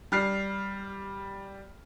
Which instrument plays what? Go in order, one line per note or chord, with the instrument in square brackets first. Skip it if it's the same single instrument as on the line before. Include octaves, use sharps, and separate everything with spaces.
[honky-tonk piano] G3 F6 C7